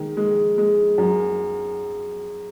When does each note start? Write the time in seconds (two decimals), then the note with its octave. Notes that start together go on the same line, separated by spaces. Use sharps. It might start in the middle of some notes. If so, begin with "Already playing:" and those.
Already playing: D#3 G#3
0.17 G#3
0.58 G#3
0.98 F#2